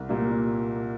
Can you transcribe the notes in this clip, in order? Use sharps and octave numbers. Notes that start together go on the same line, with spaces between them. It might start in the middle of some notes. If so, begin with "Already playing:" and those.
Already playing: C2
A#2 G3 A#3